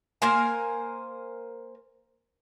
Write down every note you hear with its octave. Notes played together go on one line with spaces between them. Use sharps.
A#3 A#4 C5 G#5